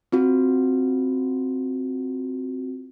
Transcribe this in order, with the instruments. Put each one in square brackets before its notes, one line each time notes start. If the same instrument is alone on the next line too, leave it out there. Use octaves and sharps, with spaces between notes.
[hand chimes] C4 F4 F#4